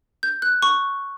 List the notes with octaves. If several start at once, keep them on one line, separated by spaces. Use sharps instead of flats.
G6
F#6
C#6